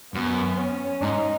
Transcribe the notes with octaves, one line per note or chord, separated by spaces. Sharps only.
F#2 B3
C#4
G#2 D#4